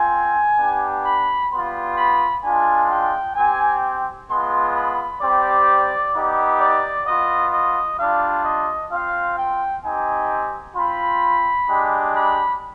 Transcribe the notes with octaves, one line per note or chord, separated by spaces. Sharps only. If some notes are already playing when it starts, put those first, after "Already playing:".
Already playing: C4 F4 G#5
B3 D4 G4
B5
G3 B3 F4 C6
B5
G#3 D4 F4 G#5
G5
C4 G4 G#5
G#3 B3 F4 C6
B5
G3 C4 G4 D5
B3 D#4 G4
D5
B3 F4 D#5
D#5
G3 D4 F4 F5
D#5
C4 F4 F5
G5
C4 D#4 G4 G#5
C4 F4 B5
G#3 D4 G4
B5